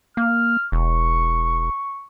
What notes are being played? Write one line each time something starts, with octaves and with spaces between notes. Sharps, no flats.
A#3 F6
E1 C#6